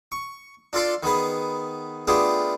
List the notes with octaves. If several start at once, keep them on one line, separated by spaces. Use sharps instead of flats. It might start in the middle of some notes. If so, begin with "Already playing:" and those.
C#6
D4 F4 A4 D5 C6
D#3 B3 G#4 B4
A3 B3 D4 F4 G4 G#4